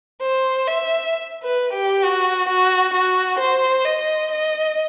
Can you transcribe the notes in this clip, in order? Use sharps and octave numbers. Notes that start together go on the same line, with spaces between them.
C5
E5
B4
G4
F#4
F#4
F#4
C5
D#5
D#5